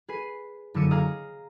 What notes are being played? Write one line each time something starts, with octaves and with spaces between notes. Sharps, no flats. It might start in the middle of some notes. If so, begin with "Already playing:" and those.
G#4 B4 C7 D#7
F#1 D3 D6 E6 C#7 D#7
G#4 F5 A#5 D#6